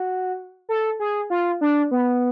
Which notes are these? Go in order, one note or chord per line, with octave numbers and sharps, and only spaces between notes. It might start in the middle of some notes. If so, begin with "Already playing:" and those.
Already playing: F#4
A4
G#4
F4
D4
B3